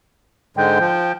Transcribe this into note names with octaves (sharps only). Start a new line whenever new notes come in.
G#2 D3 G#3 G5
F3